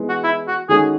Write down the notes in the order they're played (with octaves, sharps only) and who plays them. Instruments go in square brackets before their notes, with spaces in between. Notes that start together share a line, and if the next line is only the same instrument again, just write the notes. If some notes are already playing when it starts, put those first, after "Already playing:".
Already playing: [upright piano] E3 G#3 B3
[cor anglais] F#4
E4
F#4
[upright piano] D#3 G#3 C#4 F#4 A4 [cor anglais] G#4